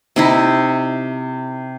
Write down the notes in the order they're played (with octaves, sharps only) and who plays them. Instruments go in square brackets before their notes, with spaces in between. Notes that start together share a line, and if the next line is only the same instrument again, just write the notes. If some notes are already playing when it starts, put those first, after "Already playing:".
[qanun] C3 D#4 E4